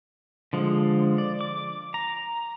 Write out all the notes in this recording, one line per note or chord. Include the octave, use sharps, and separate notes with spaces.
D3 F3 G#3
D5
D6
A#5